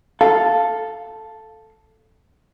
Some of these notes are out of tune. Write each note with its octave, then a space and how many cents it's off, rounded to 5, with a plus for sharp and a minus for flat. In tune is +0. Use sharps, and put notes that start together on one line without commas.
A4 +0 F5 +0